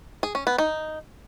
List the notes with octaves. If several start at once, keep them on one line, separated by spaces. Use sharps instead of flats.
G#4
C#4
B3
D#4